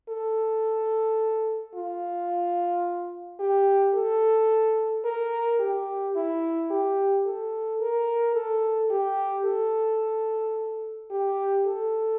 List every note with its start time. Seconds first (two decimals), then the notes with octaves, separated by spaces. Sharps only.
0.09 A4
1.75 F4
3.40 G4
3.94 A4
5.05 A#4
5.60 G4
6.16 E4
6.71 G4
7.26 A4
7.81 A#4
8.35 A4
8.91 G4
9.45 A4
11.11 G4
11.66 A4